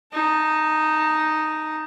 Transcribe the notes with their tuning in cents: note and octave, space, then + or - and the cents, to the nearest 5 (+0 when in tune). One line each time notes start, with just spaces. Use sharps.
D#4 +0 A5 +30